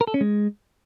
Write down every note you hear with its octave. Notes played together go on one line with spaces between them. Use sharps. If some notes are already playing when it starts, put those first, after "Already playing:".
A#4
A4
C#4
G#3